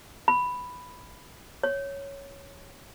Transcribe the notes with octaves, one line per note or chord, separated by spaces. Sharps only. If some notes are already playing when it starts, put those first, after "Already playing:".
B5
C#5